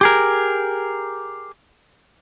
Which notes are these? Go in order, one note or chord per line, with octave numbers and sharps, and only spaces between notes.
G4 G#4 A#4